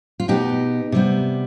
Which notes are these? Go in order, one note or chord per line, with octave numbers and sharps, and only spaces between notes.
F4
B2 B3 D#4 G4
C3 G3 B3